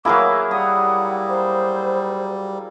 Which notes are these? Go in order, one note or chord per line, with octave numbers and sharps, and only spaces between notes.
F#3 A#3 E4 G#4 A#4 D6
G3 F#5 D#6
C5